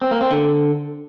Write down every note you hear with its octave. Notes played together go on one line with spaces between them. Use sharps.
C4
A#3
C4
D3